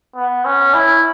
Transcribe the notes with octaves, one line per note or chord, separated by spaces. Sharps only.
B3
C#4
E4